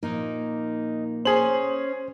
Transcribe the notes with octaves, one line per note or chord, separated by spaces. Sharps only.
A#2 F3 A#3 D#4
C#4 G#4 C5 F#7